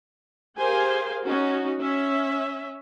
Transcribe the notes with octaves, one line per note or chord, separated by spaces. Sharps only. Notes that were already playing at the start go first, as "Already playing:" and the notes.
G4 G#4 A#4 C5 F5 G#5
C#4 D#4 F#4
C#4 E5